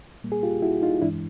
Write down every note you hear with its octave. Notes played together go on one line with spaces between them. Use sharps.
A#2 G3 A#3
G#4
F4 G4
E4 F#4
D#4 F4
G2 E3 G#3 D4 E4